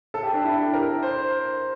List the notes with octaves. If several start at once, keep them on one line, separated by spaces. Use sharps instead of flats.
A4
G4
D4
E4
G4
A#4
C5